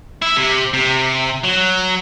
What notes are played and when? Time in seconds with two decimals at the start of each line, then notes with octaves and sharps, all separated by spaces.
0.22 E4
0.37 C3
0.73 C3
1.44 F#3